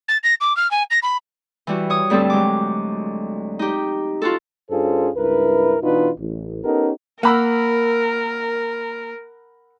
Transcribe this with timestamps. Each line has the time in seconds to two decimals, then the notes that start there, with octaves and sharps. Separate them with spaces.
0.08 A6
0.23 A#6
0.41 D6
0.57 F6
0.71 G#5
0.91 A#6
1.03 B5
1.67 E3 G3 F#4
1.90 C#5 D#6
2.10 D2 G2 G3 C4 A4
2.30 F#3 G#3 D6
3.59 D#4 G4
4.22 F4 F#4 A4
4.71 G2 C#4 F4 G#4 A4 C5
5.16 C#2 G2 E4 A#4 B4
5.82 B2 E3 D4 D#4 F4 B4
6.19 A1
6.64 B3 C#4 D#4 G4 A4 A#4
7.23 A#3 A#4 F#5 B5 E6